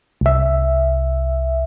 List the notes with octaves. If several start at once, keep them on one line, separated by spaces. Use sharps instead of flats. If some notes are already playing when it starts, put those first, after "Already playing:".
C2 E5